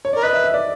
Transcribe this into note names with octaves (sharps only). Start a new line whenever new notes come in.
C#5
A#4 D5
B4 D#5
E5
E5
D5